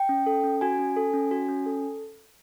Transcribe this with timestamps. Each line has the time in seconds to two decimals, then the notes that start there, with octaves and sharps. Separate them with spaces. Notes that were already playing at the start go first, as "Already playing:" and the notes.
Already playing: G5
0.09 C#4
0.26 A4
0.44 C#4
0.61 F#4 G#5
0.79 C#4
0.96 A4
1.13 C#4
1.31 F#4
1.49 C#4
1.66 A4